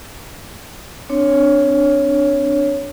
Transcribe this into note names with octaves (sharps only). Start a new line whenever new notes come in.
C4 D4 C#5